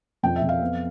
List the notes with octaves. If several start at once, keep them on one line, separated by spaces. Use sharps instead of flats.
F2 G5
E5
F2
F5
B3